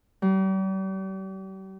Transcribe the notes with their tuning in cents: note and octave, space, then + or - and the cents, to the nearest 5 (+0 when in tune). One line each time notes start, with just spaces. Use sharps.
G3 -40